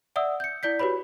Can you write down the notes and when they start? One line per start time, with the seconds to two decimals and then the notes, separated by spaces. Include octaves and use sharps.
0.16 D5 E5 F#5 D#6 E6
0.40 G6 C#7
0.63 E4 D5 G6 B6
0.79 F#4 G4 B4 C#5 B5